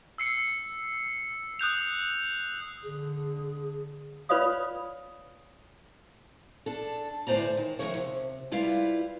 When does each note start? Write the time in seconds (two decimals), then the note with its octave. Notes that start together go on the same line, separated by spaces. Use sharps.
0.18 E6 C7 C#7
1.59 D#6 F#6 G6 F7
2.83 D3 G#4
4.29 F4 B4 C#5 D5 F5 D#6
6.66 D4 A4
7.27 A2 D3 E3 C5 D5 A#5
7.57 D#3
7.79 D2 A#2 D#3 F3 C#5 E5
7.95 C3
8.52 G3 E4 F4 B4 F5